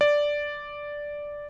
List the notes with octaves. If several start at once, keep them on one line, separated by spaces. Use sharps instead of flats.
D5